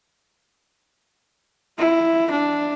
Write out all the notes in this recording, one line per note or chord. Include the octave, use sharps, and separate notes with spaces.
E4
D4